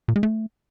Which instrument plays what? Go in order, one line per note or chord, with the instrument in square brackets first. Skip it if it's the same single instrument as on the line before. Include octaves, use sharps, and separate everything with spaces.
[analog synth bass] A#2
G#3
A3